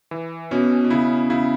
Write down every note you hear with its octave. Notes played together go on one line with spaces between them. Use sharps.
E3
B2 C#4
B2
C#3 E4
C#3 E4